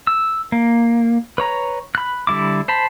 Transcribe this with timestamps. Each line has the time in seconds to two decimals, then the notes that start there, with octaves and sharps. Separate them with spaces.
0.07 E6
0.52 A#3
1.38 B4 C#5 A#5
1.95 B5 F#6
2.27 D3 G3 E4 D6
2.68 C5 A5 B5